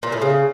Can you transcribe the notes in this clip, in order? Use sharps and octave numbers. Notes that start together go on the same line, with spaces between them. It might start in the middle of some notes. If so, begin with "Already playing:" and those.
A#2
A2
C#3